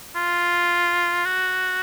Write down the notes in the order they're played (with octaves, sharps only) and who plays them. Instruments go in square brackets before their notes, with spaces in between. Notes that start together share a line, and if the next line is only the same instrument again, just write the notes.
[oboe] F4
F#4